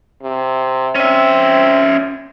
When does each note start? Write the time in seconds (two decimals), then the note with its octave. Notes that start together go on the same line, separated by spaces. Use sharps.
0.23 C3
0.95 C4 C#4 E5